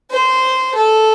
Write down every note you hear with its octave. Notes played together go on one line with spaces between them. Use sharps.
C5
A4